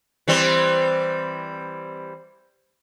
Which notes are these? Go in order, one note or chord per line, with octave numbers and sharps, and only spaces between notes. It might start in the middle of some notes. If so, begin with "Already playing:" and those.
E3 G3 C4